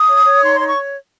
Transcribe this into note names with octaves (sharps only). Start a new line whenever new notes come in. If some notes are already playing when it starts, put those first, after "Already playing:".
Already playing: D#6
C#5
C#5
D#4 C6
C6
C#5
C#6